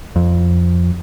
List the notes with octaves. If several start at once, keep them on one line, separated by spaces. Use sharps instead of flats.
F2